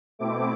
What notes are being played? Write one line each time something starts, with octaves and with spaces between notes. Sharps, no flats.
B2 A3 C4 E4 D6